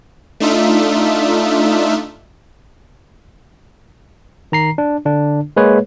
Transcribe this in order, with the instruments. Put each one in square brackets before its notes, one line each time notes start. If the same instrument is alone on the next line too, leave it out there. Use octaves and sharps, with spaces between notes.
[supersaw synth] A3 D4 D#4 F4 E5
[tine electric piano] D#3 A#5 C7
D4
D3 D4
G#3 A#3 G#4 B4 C#5